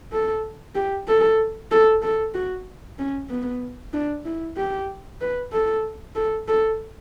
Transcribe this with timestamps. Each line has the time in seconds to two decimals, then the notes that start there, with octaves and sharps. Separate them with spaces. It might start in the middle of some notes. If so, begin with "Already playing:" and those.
0.12 A4
0.75 G4
1.08 A4
1.71 A4
2.02 A4
2.34 F#4
2.99 C#4
3.30 B3
3.93 D4
4.25 E4
4.57 G4
5.21 B4
5.52 A4
6.16 A4
6.48 A4